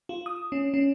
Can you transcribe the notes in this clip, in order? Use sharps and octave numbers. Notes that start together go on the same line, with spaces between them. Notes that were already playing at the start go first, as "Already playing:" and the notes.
F4
D#6
C#4
C#4